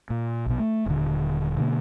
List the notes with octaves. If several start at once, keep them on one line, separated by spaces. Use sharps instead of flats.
A#2
A#1 B2
A3
D#1 D3
B2 D3 E3 A#3